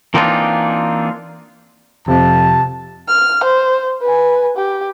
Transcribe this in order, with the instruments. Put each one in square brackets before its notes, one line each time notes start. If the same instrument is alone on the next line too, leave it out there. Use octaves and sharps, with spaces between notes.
[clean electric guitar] E3 A#3 C4 D4 D#4 F4
[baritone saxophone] F2 [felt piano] C3 [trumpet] A5
[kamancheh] F6
C5
B4 G#5
G4